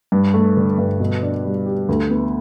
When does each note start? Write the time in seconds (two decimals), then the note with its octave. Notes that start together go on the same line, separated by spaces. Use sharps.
0.12 G2
0.34 A3
0.57 D3
0.78 G2
1.00 B2
1.22 D4
1.45 G3
1.66 G4
1.89 D2
2.10 B3